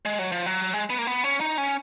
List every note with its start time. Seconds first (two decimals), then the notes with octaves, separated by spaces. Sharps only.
0.05 G#3
0.19 F#3
0.32 F3
0.46 F#3
0.74 G#3
0.90 B3
0.99 A#3
1.07 B3
1.24 C#4
1.41 D#4
1.58 C#4